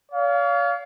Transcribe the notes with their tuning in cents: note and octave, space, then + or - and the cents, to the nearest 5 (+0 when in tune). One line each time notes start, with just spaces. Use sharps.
C#5 +45 F5 +0